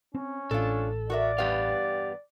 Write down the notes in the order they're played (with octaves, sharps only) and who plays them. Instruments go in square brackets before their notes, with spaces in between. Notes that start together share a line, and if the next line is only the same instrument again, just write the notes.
[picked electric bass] C4 [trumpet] C#4
[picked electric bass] A1 A2 [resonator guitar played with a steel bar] D4 F4 [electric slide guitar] A4
[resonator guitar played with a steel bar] F#4 A#4 E5 [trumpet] D5
[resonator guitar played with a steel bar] E2 G2 B3 [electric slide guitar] G4 F5